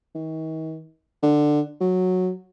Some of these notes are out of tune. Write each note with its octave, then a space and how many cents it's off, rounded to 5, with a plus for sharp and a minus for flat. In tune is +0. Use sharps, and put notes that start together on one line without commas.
D#3 +40
D3 +15
F#3 -10